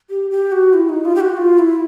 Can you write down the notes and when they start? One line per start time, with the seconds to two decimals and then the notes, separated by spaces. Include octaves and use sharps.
0.10 G4
0.31 G4
0.52 F#4
0.73 E4
0.89 D#4
1.05 F4
1.15 G4
1.20 F#4
1.37 F4
1.58 E4